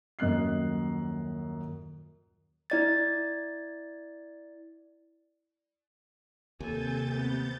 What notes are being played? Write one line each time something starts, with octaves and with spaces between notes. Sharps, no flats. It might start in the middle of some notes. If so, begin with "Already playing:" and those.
D#1 F#2 D#5 F#6 C7
E4 D5 A6
D#2 C3 A4 G#5 G6 A6
B3